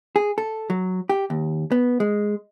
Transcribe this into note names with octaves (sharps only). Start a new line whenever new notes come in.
G#4
A4
F#3
G4
D#2
B3
G#3